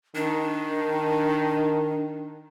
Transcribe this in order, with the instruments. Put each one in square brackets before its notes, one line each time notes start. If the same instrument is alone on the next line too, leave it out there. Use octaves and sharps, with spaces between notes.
[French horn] D#3 [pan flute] D4